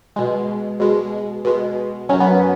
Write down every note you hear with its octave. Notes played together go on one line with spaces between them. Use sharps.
B2 G#3
B2 G#3
B2 G#3
F#2 F#3 C#4
B3